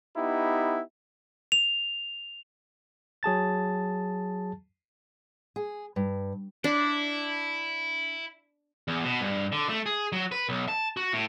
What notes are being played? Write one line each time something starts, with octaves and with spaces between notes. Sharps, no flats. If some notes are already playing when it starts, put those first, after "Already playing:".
B3 D#4 E4 G4
F7
F#3 G#4 A5 A6
G#4
G2
D4 E4
E2
B2
G2
D3
A3
G#4
F#3
B4
B1
A5
F#4
A2